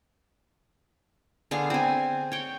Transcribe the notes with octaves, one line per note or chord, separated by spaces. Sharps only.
D3 B3 G#4 F5
C4 G#5
C#5 G5